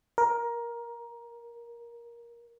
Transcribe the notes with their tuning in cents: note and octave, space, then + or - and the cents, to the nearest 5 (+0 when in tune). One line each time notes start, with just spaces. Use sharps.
A#4 +15